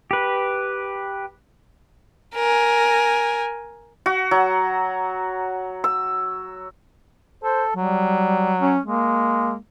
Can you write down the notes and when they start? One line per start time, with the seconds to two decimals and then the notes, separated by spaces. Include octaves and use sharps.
0.11 G4 B4
2.36 A#4 G#5
4.06 F#4
4.31 F#3
5.84 E6
7.43 A4 C5
7.75 F#3 G3
8.61 C#4
8.85 G#3 A#3